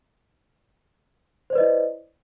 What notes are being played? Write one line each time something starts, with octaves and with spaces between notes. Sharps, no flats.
E4 B4 C5 D5 D#5